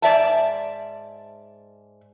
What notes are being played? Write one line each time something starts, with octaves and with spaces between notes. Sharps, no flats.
G#2 D5 E5 A5